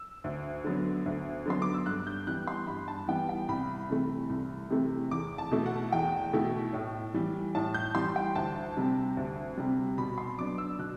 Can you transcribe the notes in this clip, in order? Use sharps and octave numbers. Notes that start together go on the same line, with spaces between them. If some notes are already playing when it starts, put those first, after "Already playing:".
Already playing: E6
D2
D3 F#3 B3
D2
D3 F#3 B3 C6
D6
E6
G2 F#6
G6
E3 G3 B3 F#6
C6
G2 B5
A5
E3 G3 B3 G5
G5
C2 B5
C3 E3 A3
C2
C3 E3 A3
E2 D6
A5
B2 A3 E4
F#5
E2 G5
B2 A3 E4
A2
E3 G3
A2 A5
G6
E3 G3 C6
G5
D2 A5
C3 G3
D2
C3 G3
B2 B5
C6
F#3 B3 D4 D6
E6
B2 F#6